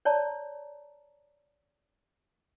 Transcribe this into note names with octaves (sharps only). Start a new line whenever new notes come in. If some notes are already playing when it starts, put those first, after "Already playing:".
C#5 D5 A5 A#5